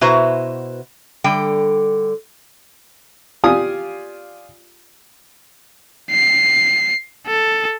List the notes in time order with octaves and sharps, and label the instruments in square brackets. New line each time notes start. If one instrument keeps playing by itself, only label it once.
[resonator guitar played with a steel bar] B2 E4 F#4 B4 C5 A#5
D3 G3 G5
[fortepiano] F4 G4 D5 F5 G#5 D#6
[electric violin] C7
A4